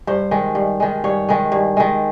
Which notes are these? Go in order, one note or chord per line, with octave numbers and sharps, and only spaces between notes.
G2 C5
D#3 G#3
G2
D#3 G#3
G2 C#5
D#3 G#3
G2
D#3 G#3